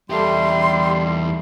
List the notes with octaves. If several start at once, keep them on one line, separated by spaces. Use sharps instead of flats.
E2 G3 G4 A4 E5 C6